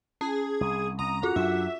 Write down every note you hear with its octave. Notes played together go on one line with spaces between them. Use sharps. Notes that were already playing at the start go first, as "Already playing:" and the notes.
C#4 G#4
C2 D#6
C2 A#5 D#6
F2 F4 F#4 F#5 D6
F#2 F#3 D4 E5